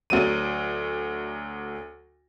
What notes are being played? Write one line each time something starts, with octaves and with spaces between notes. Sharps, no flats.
D2 F#3 D#7